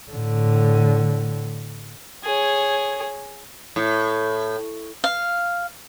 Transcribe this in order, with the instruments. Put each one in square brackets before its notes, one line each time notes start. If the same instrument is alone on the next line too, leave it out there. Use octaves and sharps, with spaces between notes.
[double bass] A2 D3
[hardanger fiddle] G#4 C#5
[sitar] A2
[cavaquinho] F5